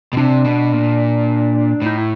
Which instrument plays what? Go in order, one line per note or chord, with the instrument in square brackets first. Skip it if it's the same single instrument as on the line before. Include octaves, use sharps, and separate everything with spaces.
[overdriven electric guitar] B2
[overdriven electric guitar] C3 [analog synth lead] D4
[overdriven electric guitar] B2
A#2
[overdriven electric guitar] A2 [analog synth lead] D#4
[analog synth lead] E4